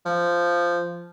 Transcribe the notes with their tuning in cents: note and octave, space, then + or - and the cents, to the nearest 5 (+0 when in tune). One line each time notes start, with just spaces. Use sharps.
F3 -10